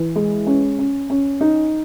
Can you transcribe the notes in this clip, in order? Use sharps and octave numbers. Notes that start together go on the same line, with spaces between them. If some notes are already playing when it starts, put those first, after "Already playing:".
Already playing: E3
G#3
C#4
C#4
C#4
D#4